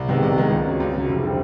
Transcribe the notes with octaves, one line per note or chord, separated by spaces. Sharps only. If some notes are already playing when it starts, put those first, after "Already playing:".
Already playing: C2
C3 D#3 G#3 B3
C2
C3 D#3 G#3 B3
C#2
C#3 F#3
C#2
C#3 F#3
F1
D3 G3 C4